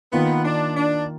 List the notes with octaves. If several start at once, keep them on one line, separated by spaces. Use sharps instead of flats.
D#3 A#3 B3 F4
D4
D4